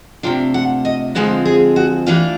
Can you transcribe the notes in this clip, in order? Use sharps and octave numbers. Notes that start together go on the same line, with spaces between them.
C3 F3 A3 D4 F4 G5
F#5
D#5
D3 F3 G#3 C4 F4 B4
G#4
F#4
E3 A3 D4 F4 G4